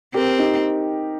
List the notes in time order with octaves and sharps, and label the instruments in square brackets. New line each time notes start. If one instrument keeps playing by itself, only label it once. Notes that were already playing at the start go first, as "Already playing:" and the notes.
[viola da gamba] C4 [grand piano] G4 A#4
[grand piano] D#4 G4